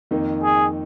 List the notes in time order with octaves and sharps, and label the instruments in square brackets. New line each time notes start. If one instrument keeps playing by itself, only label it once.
[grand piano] F2 D#3 A#3 D#4
[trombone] G#4